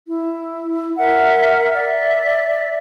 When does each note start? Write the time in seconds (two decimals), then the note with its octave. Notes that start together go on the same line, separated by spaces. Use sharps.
0.07 E4
0.97 A#4 E5 F#5
1.73 D5 E5